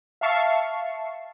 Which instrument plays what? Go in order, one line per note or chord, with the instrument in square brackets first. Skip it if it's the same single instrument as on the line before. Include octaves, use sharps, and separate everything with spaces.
[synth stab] E5 F5 A5 C#6 C7